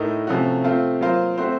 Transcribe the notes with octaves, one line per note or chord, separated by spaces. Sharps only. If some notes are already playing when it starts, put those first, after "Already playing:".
Already playing: A2 A3 D#4 A#4
C3 F3 A3 C#4 F#4
A3 C4 F4
F#3 A#3 F4 C5
A3 C4 F#4 C5